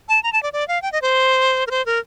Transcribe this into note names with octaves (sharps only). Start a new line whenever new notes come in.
A5
A#5
A5
D5
D5
F5
G5
D#5
C5
A#4
C5
A#4